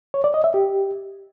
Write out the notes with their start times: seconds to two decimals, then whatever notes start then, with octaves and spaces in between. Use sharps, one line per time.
0.14 C#5
0.24 D5
0.34 D#5
0.44 E5
0.54 G4